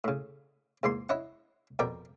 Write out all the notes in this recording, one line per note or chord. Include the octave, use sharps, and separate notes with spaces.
A2 C#3
E2 G#2 A#3 C6
E4 C#5 D#5 F#5
F2 B2 A#4 D5 G5